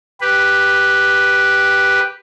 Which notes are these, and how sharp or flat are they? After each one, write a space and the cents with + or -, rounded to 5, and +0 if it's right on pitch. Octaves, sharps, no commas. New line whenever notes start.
G4 +0 B4 +0